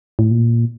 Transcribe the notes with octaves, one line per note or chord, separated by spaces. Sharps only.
A2
A#2